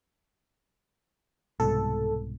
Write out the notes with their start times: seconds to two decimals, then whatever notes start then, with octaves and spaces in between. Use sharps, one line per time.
1.60 C2 G#2 B2 A4